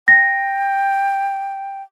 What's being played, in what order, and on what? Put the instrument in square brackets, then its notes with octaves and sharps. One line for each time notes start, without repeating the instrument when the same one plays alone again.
[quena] G5 [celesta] A#6